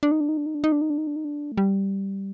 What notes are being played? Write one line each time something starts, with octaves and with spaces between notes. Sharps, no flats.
D4
D#4
D4
D#4
D4
D#4
D4
D#4
D4
D#4
D4
D#4
D4
D#4
D4
A3
G3